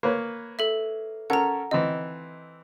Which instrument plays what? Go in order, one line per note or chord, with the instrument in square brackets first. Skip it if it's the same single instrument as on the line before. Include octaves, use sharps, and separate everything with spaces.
[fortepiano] A#3 B4 C#5
[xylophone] A4 E5
[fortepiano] C#4 A4 A#4 [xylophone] F#5 A#5
[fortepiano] E3 C4 D#4 [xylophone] D#5